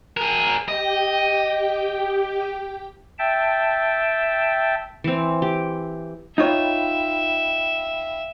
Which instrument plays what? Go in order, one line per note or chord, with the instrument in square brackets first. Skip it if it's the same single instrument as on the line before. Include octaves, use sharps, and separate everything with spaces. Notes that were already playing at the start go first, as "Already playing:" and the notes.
[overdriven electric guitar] G#4 A#4
[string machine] G4 G5 [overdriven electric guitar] D#5
[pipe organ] E5 G5 A5
[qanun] E3 C4
G4
[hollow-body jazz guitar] D#4 F4 C#5 [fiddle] E5 [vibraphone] F5 G5 B5